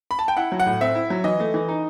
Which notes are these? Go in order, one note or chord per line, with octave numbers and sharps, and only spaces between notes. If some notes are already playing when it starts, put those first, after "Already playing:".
B5
A5
G5
E4 F#5
F#3
F#5
A2
C4 E5
E4
F#3
E3 D#5
A3
E3
D#4